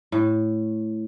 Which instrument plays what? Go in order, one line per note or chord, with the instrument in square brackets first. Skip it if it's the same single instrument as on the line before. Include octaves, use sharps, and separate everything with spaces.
[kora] A2